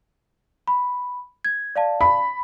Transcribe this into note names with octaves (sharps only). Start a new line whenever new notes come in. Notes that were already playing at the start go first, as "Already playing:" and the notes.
B5
G#6
D5 F5 A5
B5